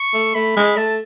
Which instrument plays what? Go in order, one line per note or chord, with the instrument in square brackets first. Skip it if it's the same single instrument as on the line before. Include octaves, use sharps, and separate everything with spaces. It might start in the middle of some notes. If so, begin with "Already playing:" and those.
Already playing: [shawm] C#6
[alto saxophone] A3
[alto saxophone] A3 [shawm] B5
[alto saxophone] G#3
[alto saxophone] A3 [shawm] A5